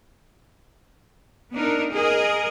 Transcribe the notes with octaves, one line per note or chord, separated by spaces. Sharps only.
B3 D4 D#4 A#4
G#4 A#4 D#5